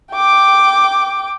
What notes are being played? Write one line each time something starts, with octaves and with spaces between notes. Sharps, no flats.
G5 D6